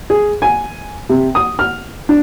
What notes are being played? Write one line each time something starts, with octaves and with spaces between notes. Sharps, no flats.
G#4
G#5
C3
D#6
F6
D4